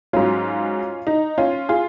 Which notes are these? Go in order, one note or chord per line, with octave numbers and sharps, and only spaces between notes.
G#2 F#3 C#4 F4
D#4
C#4 F4
F4 G#4